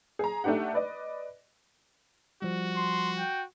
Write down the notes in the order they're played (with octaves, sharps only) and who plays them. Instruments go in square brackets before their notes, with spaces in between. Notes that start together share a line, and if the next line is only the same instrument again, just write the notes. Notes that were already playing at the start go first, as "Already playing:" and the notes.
[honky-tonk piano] G#4 A#5
A3 D4 D#4 G4 F#5
B4 D5 D#5
[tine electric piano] F3 G3 [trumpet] F#4
[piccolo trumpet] C6
G5